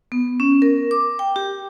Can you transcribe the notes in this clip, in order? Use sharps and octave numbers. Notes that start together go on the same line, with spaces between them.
B3
C#4
A#4
D6
G5
G4